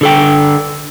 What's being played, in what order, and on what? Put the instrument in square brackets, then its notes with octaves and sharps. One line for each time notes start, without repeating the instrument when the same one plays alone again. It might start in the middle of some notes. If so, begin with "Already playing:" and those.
[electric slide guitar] D3 A4 G5